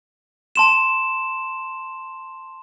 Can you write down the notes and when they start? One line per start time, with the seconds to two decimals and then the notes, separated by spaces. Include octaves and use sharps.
0.56 A5 C6 E7